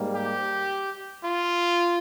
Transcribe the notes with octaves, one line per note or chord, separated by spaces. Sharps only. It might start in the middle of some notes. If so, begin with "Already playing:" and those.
Already playing: G#2 G3 A#3
G4
F4